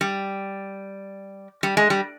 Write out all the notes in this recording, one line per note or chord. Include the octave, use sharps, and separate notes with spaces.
G3
G3
G#3
G3